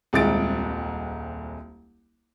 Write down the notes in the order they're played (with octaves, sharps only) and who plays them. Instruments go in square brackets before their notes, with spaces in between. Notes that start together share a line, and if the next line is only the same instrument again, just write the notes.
[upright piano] D#1 C2 G#3 A6 D7